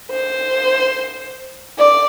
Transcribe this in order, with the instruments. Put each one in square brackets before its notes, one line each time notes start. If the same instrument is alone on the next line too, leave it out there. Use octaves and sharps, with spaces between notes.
[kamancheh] C5
D5